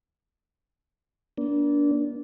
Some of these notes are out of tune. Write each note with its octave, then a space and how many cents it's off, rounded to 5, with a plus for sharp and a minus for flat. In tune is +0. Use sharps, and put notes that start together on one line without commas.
A#3 +40 D4 -20